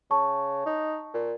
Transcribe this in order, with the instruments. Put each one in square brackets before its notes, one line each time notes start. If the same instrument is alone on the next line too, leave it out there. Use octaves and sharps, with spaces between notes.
[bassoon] C#3 [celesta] A5 C#6
[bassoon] D#4
A#2